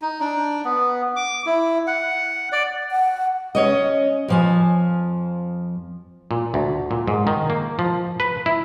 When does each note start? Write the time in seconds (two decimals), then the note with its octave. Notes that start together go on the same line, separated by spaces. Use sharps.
0.02 D#4
0.20 D4
0.65 B3
1.16 D6
1.46 E4
1.87 F#5
2.52 D5
2.91 F#5
3.55 C#4 C#5 D#5
4.28 F2 F3 G#5
6.31 A#2
6.54 D2
6.91 A#2
7.07 G#2
7.27 D#3
7.50 A#3
7.79 F3
8.20 B4
8.46 E4